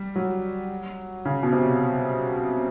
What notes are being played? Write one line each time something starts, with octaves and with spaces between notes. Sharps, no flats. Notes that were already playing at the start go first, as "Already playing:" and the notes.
Already playing: G3
F#3
C#3
B2
C3